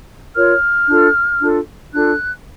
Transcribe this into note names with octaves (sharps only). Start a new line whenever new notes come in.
F4 A#4 C#5 F6
D4 F4 A4
D4 F4 A4
D4 F4 A4 F#6